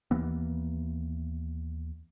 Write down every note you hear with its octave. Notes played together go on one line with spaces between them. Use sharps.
D#2 E3 A#3 B3